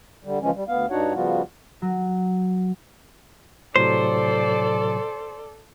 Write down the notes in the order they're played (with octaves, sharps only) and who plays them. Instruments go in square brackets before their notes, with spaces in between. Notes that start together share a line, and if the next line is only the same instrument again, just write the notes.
[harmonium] D3 G3
C#3 E3 F3 G#3 C#4
G3
D2 B3 F5
G2 D4 D#4 F#4 C#5 F#5
C#3 F3 G3 B3 F4 F#4
[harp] F#3
[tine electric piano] A2 C3 F#3 [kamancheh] A4 D5 [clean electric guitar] C5